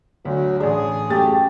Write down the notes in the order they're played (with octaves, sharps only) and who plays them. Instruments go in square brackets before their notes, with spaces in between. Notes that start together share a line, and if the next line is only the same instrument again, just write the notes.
[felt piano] D2 [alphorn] F#3
[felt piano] A1 D4 [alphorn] G#4
[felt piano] F#2 A3 A6 [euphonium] G4